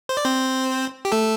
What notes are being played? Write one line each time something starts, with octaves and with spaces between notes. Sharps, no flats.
C5
D5
C4 C5
G4
A3 A4